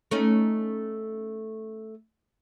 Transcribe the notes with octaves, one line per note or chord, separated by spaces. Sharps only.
A3 C#4 D#4